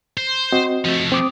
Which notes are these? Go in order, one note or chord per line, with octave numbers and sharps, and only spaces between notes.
C5
C4 F#4 D#5
F3 A3
C4 D6 D#6